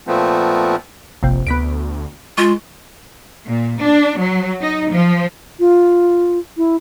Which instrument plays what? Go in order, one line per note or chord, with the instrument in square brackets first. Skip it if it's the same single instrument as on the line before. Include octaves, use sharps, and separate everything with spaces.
[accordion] A#2 F3 A3 B3 C4
[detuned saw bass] F1 [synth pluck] A#1 C3
[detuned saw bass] D2 [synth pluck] B3 B6 D7
[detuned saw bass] G#3 [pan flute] F4 [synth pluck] C#6
[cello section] A#2
D4
F#3
D#4
F3
[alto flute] F4
E4